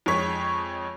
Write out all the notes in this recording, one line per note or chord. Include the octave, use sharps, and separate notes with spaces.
F2 G#3 C#5 B6